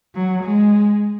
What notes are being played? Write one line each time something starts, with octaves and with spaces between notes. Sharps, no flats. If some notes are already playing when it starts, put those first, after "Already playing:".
F#3
G#3